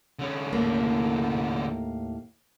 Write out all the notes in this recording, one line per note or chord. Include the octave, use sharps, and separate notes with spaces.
D3 C#4
D#2 A2 A#3